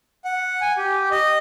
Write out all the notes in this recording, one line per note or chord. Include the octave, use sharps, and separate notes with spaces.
F#5
G#5
G4
D#5